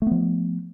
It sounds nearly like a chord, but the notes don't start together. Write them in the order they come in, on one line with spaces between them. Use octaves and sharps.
A3 B3 F3